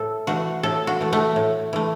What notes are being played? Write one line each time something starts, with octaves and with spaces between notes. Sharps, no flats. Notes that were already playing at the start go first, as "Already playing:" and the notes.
Already playing: A2 A4
E3 A3 F#4
A2 A4
F#4
E3 A3
A3
A2
E3 A3